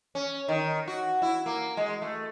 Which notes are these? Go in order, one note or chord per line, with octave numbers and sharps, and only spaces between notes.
C#4
D#3
F#4
E4
A#3
G#3
A3